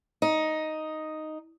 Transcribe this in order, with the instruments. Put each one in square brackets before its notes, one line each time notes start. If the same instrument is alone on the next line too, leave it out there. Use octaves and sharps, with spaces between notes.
[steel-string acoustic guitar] D#4